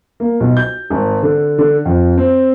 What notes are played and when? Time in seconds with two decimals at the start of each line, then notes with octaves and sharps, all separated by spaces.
0.20 A#3
0.40 B1
0.57 G6
0.90 G#1
1.23 D3
1.58 D3
1.85 F2
2.18 C4